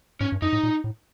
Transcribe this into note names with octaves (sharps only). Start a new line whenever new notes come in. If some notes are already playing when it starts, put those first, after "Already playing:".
G#2 C#4
G2
F#2 D#4
A2
A#2
A2